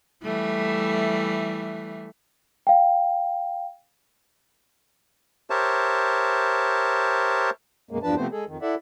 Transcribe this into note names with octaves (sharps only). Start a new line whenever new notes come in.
E3 G3 A3
F5 G5
G4 A#4 C5 C#5 E5 A5
F#2 B2 G#3 A#3
E2 G2 F3 D4 B4 A5
C3 F3 A3 B3 C4 C5
G#3 G#4 A4
F2 D#3
E4 A4 D5 E5 F#5